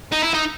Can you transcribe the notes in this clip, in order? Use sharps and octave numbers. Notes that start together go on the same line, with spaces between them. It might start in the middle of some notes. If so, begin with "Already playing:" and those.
D#4
E4
D#4